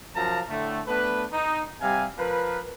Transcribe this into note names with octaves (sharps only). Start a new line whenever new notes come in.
F#2 F3 F5 A5 A#5
A2 D3 A3
A3 B3 D4 B4
D#4
C3 G3 F5 G#5
F3 A#4 B4